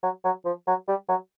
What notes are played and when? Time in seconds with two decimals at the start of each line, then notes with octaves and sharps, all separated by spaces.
0.03 F#3
0.24 F#3
0.45 F3
0.67 F#3
0.88 G3
1.09 F#3